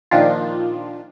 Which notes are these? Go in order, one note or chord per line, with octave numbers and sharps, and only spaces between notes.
A#2 D#3 F3 D4 F4